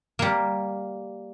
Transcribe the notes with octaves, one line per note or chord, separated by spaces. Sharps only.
G3 A#3